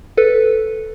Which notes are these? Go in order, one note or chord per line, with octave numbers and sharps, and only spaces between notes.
A4 B4